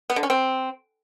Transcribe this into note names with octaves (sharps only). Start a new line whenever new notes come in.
B3
D3
C#4
C4